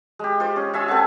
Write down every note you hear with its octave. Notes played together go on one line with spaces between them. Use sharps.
G#3 G4
F4 C5
C#4
F4 E5 G#5 E6
C4 A4 F#5 G#5